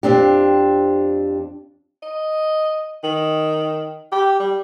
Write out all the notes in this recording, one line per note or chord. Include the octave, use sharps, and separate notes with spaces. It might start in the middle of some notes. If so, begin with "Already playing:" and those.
F2 C4 D4 G4
D#5
D#3
G4
G3